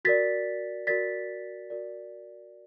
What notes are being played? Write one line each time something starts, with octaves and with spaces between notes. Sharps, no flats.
F#4 A#4 D5 A6 B6
F#4 A#4 D5 A6 B6
F#4 A#4 D5